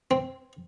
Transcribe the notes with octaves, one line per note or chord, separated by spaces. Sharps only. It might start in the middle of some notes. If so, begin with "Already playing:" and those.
C4